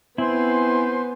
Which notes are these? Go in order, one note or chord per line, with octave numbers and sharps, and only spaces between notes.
B3 C4 E4 C5 G#5 C6